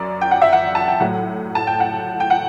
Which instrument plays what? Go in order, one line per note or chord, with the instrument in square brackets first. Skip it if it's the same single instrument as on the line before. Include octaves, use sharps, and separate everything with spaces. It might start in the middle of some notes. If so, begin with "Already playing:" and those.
Already playing: [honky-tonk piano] F#2 D5
G5
F#5
E5
F#5
A5
G5
A2 F#3 F#5
A5
G5
F#5
G5
F#5